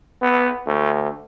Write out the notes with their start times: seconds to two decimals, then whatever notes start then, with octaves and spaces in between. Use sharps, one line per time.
0.22 B3
0.66 D2